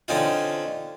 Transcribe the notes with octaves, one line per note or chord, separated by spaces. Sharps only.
D3 C4 C#4 D#4 F4